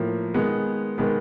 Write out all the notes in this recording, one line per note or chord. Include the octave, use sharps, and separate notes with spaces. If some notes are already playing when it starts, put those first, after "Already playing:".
Already playing: A2 F3 A#3
D#3 G#3 B3
D#3 G#3 B3